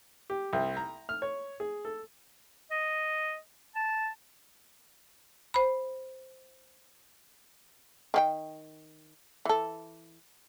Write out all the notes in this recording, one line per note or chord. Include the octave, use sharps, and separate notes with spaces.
G4
C2
A#5
F6
C#5
G#4
A4
D#5
A5
C5 B5
D#3 G4 G5
E3 A4